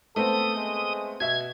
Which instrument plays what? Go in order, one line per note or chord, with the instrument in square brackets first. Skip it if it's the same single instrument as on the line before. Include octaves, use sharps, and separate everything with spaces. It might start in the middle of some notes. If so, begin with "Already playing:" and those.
[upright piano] A3 B3 C4 [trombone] A4 [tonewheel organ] D#6
[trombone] G#3
[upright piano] B2 E5 [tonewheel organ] G#6